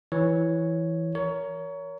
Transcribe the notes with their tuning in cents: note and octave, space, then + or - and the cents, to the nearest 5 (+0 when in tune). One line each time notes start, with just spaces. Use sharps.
E3 +0 C#5 +0
A#4 +0 C#5 +25